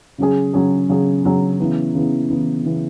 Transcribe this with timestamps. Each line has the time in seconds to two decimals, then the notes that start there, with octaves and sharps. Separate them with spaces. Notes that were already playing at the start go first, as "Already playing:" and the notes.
0.18 C#3 F#3 C#4 G#4
0.54 C#3 F#3 C#4 G#4
0.89 C#3 F#3 C#4 G#4
1.24 C#3 F#3 C#4 G#4
1.59 C#3 E3 B3
1.94 C#3 E3 B3
2.29 C#3 E3 B3
2.64 C#3 E3 B3